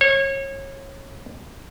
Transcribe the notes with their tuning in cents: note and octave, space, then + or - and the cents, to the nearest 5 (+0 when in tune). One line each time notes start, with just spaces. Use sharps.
C#5 -25